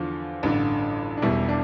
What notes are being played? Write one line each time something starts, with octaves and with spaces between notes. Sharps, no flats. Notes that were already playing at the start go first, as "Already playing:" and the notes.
Already playing: E2 D3 F3 F4
A1 G2 D3
D4
E1 E2 B2 G3 E4
D4